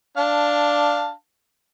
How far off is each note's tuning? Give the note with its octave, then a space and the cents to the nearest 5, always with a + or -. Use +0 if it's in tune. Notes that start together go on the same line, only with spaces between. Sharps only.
D4 +0 F5 +0 A5 +10